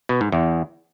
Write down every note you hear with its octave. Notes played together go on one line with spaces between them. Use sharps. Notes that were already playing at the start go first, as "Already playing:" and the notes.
B2
G#2
E2